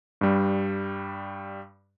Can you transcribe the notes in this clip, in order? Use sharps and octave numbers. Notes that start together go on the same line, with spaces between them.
G2 G3